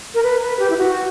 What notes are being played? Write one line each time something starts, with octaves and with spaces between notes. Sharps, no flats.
A#4
B4
B4
G4
E4
F#4